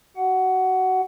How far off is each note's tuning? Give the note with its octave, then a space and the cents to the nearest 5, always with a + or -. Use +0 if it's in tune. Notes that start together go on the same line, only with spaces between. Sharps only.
F#4 +25 F#5 +10